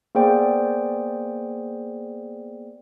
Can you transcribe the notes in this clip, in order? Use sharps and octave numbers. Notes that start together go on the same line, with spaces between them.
A#3 B3 G#4 C5 D5 G5